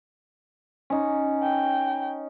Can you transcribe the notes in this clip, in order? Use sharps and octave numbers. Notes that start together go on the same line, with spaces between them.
C#4 D#4
G5